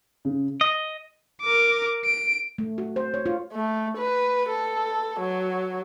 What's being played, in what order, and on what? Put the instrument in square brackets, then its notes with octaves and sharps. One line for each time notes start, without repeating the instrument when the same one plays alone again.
[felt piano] C#3
[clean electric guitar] D#5
[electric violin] A#4 D6
D7
[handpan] A3
F#4
C5
C#5
F4
[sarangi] A3
B4
A4
F#3